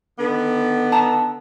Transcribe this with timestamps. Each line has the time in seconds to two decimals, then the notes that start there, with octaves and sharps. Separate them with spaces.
0.19 D3 D#3 B3
0.92 A5 A#5 E6